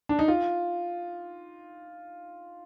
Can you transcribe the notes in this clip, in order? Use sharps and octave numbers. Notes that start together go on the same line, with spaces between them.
D4
D#4
F4